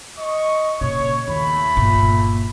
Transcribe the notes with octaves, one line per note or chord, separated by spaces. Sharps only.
D#5 C#6
A#2 C#3 C#5
D#2 A3 B5
G1 A#2